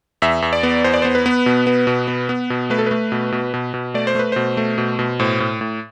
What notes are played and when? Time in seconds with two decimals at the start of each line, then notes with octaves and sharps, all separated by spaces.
0.22 E2 E5
0.42 E2
0.53 D5
0.63 B3
0.84 E2 C5
0.94 D5
1.02 B3 C5
1.15 B4
1.26 B3
1.46 B2
1.67 B3
1.87 B2
2.08 B3
2.29 B3
2.50 B2
2.70 A3 B4
2.78 A4
2.86 A3 B4
3.12 B2
3.32 B2
3.54 B2
3.74 B2
3.94 A3 D5
4.07 C5
4.15 A3 B4
4.32 B2 C5
4.57 A3
4.78 B2
4.99 B2
5.20 A2 C5
5.40 A2
5.61 A2